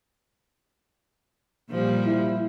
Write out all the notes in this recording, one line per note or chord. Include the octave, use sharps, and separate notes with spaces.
A#2 F3 G3
E4